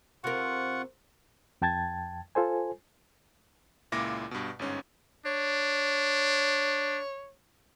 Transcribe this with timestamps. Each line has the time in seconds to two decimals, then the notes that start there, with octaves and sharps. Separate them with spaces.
0.24 C3 F4 A#4 F#5 C#6
1.62 F2 G5 A5 G#6 A6
2.35 F4 A4 C5 G#5
3.92 C#2 A#2 E4 F4 D6 A#6
4.31 G2 B2
4.59 G1 G#2 C#4
5.26 D4 C#5